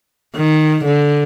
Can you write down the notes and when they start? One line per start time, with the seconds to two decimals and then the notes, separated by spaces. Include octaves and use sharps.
0.36 D#3
0.85 D3